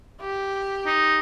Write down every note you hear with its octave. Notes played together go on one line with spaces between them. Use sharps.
G4
D#4